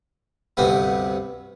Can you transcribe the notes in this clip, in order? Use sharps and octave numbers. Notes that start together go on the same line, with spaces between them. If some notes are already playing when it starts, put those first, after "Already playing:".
D2 G2 C3 B3